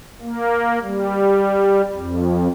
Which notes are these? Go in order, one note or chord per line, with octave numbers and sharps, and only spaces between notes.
A#3
G3
F2